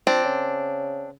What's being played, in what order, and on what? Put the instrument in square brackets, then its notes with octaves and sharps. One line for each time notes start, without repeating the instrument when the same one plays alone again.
[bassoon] F3 [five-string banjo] C4 D4
[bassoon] C#3